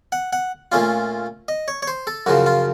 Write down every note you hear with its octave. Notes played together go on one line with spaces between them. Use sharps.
F#5
F#5
A#2 A3 C#4 F4
D#5
C#5
C#5
C5
A4
F#2 C#3 F3 F#4
F4